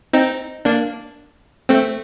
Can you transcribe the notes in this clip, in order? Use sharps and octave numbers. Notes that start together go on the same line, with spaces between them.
C4 D#4
A#3 D4
A3 C4